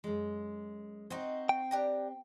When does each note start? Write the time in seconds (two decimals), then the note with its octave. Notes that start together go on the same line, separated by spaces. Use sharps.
0.04 F#2 G#3
1.10 C4 D#4 F#4 C5
1.49 G5
1.71 D4 G4 A#5